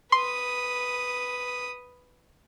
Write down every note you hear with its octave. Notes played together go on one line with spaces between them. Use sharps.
B4 C6 D#6